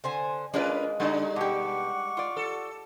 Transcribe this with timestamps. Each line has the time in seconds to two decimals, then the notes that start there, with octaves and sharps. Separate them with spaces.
0.04 D3 C5 G#5
0.54 G#3 A#3 C#4 D4 F4 A#4 B4
1.00 D3 G3 D4 D#4
1.36 B2 G4 F#5 C#6 D6
2.17 F4 D5
2.37 A4